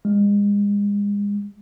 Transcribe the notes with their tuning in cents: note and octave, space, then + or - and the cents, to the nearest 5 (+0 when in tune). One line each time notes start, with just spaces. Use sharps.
G#3 -35